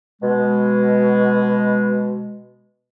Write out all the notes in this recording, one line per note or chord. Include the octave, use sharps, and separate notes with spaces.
B2 G#3